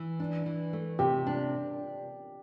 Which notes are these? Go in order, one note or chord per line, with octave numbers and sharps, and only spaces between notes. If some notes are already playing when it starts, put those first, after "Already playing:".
Already playing: E3
D4
E3
A3
C3 G4
D4